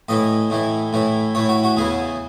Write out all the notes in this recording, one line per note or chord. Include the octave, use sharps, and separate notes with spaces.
A2 E3 D#5
A2 E3
A2 E3
A2 E3 C#5
F#4
F#4
E2 C#3 E3 G#4